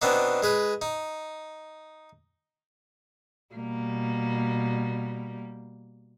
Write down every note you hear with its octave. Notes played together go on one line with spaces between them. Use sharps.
B2 B3 C4 D4 D#4
G#3 G#4 B4
D#4
B2 G3 A#3